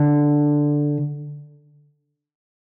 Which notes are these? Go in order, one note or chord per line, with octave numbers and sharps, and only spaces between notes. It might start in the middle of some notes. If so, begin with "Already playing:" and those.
Already playing: D3